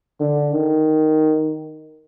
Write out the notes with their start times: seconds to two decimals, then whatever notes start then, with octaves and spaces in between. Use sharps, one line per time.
0.20 D3
0.52 D#3